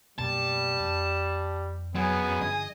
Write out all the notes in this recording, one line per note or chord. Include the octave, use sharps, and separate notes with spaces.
F#2 B2 G3 A#3 A5
F2
F#2 F#3 B3 G#4 G#5
G2 D3 F3 D#5